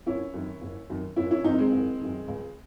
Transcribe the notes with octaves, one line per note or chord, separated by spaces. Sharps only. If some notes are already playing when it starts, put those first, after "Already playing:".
F#1 C#4 E4
F#2 D#3
F#1
F#2 D#3
F#1 C#4 E4
C#4 E4
F#2 D#3 C4 D#4
G#3 C4
F#1
F#2 D#3
C#2